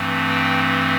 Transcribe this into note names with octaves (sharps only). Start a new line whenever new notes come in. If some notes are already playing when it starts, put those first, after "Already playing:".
Already playing: G2 E3 A3 C4
G5